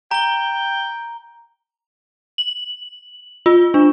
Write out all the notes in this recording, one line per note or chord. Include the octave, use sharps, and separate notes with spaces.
G5 A#5 G7
F#7
F4
D4